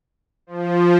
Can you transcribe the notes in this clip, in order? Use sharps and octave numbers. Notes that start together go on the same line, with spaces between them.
F3